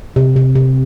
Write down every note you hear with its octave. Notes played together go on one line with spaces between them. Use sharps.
C3
C3
C3